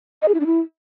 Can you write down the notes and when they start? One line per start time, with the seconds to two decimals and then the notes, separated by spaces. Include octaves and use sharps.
0.22 D#5
0.28 G#4
0.34 E4
0.40 D4
0.46 E4